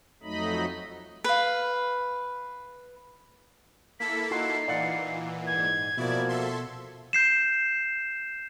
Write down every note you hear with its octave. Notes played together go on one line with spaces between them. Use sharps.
F2 F#3 A3 D#4 D#5 B5
B4 F5
A#3 E4 A4 B6
D#4 F4 F#4 C7
A#2 E3 D5 F5 F#5
G#2 G#6
B2 F3 A#3 E4 F#4 D5
A4 E5 C6
G6 C7 E7